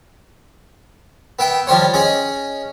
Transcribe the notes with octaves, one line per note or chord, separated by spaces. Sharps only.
B3 E5 G5
F3 G3 C5 C#5
C#4 G#4 D#5